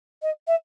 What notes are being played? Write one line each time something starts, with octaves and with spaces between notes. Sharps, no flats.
D#5
E5